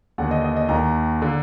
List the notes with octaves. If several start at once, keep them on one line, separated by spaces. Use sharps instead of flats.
D#2 D3 F#5
D#5
D#5
D#5
D#2 D#3 A#5
D3